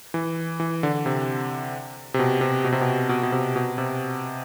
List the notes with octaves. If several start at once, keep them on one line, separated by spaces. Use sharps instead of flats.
E3
E3
D3
C3
C3
B2
C3
B2
C3
B2
B2
B2
C3
B2
C3